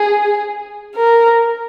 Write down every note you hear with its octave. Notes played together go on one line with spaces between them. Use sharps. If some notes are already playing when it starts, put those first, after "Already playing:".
Already playing: G#4
A#4